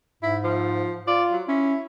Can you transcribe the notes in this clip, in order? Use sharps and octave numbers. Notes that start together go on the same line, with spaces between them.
G#2 E4
F3
F4 D5
F#3
C#4 E4